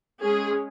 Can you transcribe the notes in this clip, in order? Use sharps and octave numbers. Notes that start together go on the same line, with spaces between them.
G#3 C#4 G#4